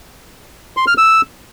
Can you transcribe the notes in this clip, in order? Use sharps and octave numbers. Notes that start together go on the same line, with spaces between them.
C6
F6
E6